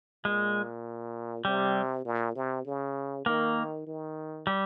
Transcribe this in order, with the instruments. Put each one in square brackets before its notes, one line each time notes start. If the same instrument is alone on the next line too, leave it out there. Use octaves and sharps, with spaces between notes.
[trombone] A#2 [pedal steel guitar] G#3
[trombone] C3 [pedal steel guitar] G3
[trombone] A#2
C3
C#3
[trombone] D#3 [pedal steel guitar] A#3
[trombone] D#3
[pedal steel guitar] G3